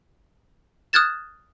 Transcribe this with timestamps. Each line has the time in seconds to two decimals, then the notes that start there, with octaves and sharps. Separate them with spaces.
0.93 D#6 F6 F#6 G#6 A6 E7